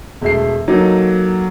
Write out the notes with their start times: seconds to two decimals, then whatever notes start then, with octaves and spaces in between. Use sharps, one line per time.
0.22 E1 A3 C7
0.68 F#3 A#3 D#4 A4 D#5